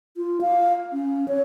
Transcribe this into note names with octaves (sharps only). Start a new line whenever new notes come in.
F4
F5
C#4
C#5